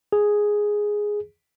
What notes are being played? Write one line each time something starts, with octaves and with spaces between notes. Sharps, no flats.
G#4